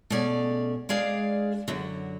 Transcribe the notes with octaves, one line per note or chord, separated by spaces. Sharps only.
B2 A3 C#4 G#4 D5
G#3 D4 G#4 D5 F5
F#2 D3 F#3